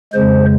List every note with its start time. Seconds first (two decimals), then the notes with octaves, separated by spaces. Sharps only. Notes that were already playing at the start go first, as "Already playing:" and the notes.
0.13 F2 C#3 G#3 C5